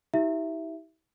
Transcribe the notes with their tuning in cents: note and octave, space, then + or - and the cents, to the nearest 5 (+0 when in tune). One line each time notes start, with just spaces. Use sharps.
E4 -45 G4 -25 E5 +10